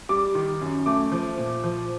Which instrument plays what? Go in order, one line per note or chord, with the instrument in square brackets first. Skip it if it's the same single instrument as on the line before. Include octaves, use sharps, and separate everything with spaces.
[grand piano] G3 D6
D#3
F#2
A3 D6
F3
A#2
F3